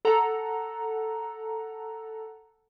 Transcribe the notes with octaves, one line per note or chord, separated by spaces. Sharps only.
A4 F#5 A#5